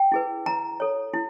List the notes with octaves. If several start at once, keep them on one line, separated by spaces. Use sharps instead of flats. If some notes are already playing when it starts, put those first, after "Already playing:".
Already playing: G5
E4 G#4 B4
E4 A#5
A4 C#5
E4